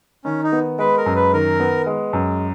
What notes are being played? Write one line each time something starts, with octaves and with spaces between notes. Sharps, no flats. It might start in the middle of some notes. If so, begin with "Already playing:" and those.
D#3 C#4
D#4
B3
G#3 B4
A#4
F#2
B4
D#3 A#4
B3
G#3
F#2